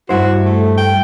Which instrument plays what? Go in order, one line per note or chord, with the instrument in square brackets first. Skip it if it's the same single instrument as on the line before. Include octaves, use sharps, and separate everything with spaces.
[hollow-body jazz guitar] G2 E4 C5 [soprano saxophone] F#4
[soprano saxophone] A3
G5